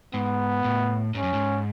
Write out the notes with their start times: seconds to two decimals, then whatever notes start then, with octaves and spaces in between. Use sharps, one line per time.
0.14 G#2 B3
0.65 A2
1.15 G#2 C#4
1.23 F#2
1.33 G#2